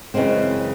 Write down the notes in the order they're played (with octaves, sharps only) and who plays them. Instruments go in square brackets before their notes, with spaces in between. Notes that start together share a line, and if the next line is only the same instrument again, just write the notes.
[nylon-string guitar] F#2 C#3 E3 G#3 C4